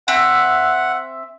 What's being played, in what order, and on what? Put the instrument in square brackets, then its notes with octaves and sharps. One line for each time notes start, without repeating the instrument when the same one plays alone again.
[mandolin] C4 E5 [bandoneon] F#5